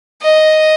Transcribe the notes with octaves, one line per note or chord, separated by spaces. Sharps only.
D#5